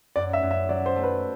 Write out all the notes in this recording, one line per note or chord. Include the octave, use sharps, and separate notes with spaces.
F#2 D5
E5
F#2
E5
F#3 D5
C5
A3
B4